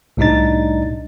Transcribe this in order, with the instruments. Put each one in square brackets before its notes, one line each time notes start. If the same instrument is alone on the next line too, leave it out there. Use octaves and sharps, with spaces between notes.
[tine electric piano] C2 A2 G3 D4 D#4 A6